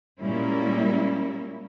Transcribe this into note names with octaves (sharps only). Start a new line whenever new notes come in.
A#2 G3 G#3 A#3 C#4 E4